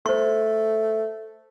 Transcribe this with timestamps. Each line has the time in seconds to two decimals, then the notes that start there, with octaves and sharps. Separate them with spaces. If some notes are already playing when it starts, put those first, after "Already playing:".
0.06 A3 C5 C#6